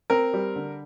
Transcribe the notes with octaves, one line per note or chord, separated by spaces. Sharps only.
C4 A#4
G3
D3